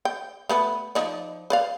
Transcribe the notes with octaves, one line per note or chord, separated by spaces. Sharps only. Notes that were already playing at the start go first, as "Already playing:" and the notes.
G5
A3 B3 B4
F3 D#4 D5
B4 D5 F5